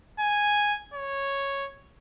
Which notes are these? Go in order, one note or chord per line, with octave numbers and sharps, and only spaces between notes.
G#5
C#5